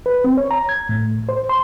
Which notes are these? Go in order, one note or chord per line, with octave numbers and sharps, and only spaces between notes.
B4
C4
C#5
A#5
G#6
A2
C5
C6